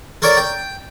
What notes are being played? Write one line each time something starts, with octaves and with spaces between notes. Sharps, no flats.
A4 A#4 C#5 D5 A5 A#5
G5